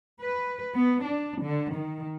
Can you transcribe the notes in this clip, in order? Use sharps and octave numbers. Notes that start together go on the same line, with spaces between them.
B4
B3
D4
D3
D#3